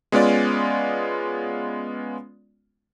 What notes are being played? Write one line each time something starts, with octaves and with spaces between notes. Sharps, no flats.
G#3 B3 C#4 F4 D5